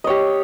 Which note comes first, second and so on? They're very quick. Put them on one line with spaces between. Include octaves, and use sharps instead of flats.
D#5 C#5 G4